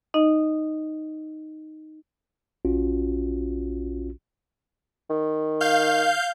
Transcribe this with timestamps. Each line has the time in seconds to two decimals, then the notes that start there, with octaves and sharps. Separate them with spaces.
0.14 D#4 D#5
2.65 A#1 C#4 F4 F#4
5.10 D#3
5.61 F5 G6